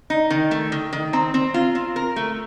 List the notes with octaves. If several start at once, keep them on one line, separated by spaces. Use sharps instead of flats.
D#4
D#3
A3
D#3
D#3
C4 A#5
C4
F4
C4
A#4
A3